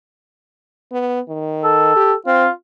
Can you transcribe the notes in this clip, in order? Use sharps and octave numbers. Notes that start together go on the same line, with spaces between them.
B3
D#3
A4
G4
C4 F4